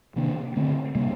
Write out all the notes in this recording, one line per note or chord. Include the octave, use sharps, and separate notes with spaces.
C3 D#3 A#3 D4
D3 A3 C4
C3 G3 A#3